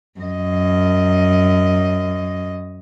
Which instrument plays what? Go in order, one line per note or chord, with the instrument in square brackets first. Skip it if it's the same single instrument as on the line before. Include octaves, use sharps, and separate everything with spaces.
[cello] F#2 D#5